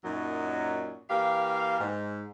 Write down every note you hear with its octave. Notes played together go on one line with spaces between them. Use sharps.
F#2 A#2 F#3 D#4
E3 A#3 G4 F5
G#2